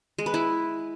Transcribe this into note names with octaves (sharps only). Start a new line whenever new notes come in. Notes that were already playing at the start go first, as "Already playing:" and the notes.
G#3
B4
E4